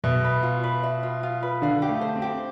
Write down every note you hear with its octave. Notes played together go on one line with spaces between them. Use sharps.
B2 E5
B4
F4
B4
E5
F4
F4
B4
D3 F5
G4
A3
C5
C4
G4